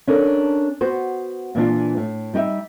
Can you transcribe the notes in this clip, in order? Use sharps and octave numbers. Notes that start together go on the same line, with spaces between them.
C#4 D4 A4 A#4
B3 F#4 C5
A#2 E3 D4 F4
A2
G3 D#4 G4 E5